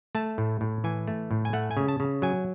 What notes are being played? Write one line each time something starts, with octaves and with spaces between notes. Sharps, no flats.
A3 A5
A2
A2
E3 G#5
A3
A2
G#5
A3 F#5
G#5
C#3
A5
C#3
F#3 G#5